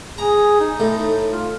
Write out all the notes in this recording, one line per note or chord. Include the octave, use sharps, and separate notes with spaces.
G#4 A#5
D#4
A2
F4